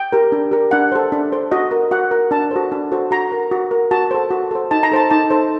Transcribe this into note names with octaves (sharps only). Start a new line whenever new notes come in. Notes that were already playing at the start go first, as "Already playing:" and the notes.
Already playing: G5
G4 A#4
D4
G4 A#4
D4 F#5
A4 C5
D4
A4 C5
F#4 D#5
A#4
F#4 F#5
A#4
D4 A5
F#4 A4 C5
D4
F#4 A4 C5
F#4 A#5
A#4
F#4
A#4
F#4 A5
A4 C5
F#4
A4 C5
D#4 A5
A#5
A4 C5 A5
D#4 A5
A4 C5